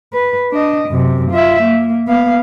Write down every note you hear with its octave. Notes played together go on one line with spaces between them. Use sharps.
B4
D4 D#5
F#2 C3
F4 E5
A#3
B3 F5